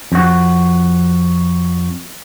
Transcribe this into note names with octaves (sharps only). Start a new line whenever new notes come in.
F2 F#4